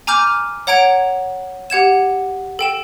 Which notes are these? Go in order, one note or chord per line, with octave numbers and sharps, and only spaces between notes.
G#5 A#5 D6 F6 G6
C#5 F#5 A#5 G#6 D7 F7
G4 F#5 G#6 E7
A4 G5 E7